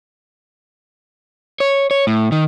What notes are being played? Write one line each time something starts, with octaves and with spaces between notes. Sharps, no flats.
C#5
C#5
A2
D#3